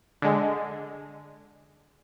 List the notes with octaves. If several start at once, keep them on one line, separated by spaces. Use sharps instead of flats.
D3 G#3